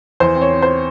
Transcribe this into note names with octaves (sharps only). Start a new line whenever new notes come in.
E2 C5
C4
C#5
C4
C5